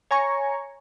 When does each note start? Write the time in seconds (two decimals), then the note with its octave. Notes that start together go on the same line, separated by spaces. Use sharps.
0.11 C#5 G#5 A#5 C#6